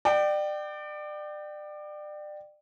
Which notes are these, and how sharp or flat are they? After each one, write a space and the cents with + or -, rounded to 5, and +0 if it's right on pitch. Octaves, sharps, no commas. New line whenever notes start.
D5 +30 G5 -20